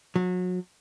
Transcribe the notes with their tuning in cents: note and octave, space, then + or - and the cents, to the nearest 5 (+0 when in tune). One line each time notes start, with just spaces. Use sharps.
F#3 -30